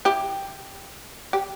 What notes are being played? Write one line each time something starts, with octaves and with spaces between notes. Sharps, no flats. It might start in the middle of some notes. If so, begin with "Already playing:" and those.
E4 G4
G4